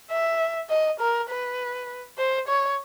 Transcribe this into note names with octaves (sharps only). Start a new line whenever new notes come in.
E5
D#5
A#4
B4
C5
C#5